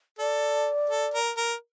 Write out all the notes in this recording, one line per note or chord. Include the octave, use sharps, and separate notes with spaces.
A4 D5
A4
A#4
A#4